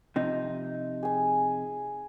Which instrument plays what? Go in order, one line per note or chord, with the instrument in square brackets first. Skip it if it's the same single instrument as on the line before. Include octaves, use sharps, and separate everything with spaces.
[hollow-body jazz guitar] C3 F3 D#4
[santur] G#4 G#5